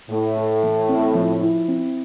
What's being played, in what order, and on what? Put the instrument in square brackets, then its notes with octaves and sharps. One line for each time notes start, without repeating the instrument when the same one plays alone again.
[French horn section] A2 [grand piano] A3
[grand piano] A4
E3
C4
F3
E4
C4